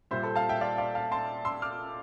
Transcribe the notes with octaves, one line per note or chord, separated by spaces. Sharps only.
A#2 G3 C5 E5
A4 C5
F5 A5
E5 G5
D5 F5
D5 F5
F5 A5
A5 C6
C6 E6
D6 F6